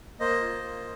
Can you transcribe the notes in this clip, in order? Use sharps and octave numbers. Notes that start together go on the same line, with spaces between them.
A#3 C5 D#5
F4
A#3